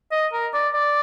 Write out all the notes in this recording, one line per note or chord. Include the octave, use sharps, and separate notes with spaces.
D#5
A#4
D5
D5